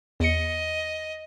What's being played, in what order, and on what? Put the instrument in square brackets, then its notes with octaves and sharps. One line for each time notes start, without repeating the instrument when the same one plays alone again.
[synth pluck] E2 C#7 [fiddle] D#5